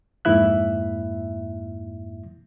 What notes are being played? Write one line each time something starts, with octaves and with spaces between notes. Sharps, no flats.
F2 G#2 A#3 E4 E5 F#6